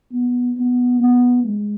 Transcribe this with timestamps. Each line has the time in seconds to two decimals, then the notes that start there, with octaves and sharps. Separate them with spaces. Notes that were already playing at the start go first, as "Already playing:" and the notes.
0.11 B3
0.56 B3
1.00 B3
1.44 G#3